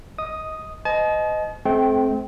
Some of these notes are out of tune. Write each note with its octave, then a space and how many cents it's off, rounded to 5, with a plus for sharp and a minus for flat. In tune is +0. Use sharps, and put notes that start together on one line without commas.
D#5 +20 D#6 +0
C5 -45 D#5 +0 A5 -45
A3 -40 C4 +0 G5 -15